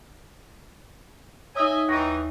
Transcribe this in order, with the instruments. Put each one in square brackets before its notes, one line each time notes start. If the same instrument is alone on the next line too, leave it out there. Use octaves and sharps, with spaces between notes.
[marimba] D#4 C#5 [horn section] D#5 E5 G#5
[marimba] D#2 C#6 A#6 [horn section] E3 D#4